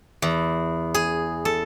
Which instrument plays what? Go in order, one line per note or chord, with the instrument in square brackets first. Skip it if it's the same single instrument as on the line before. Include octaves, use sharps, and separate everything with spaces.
[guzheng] E2
G#4
A4